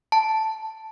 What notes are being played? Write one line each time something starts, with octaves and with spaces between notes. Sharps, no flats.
A5